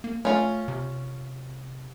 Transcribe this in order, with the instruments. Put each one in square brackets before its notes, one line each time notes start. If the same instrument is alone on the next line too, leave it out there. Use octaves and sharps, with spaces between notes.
[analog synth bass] A#3
[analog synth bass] A3 [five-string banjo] C#4 F4
[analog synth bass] C3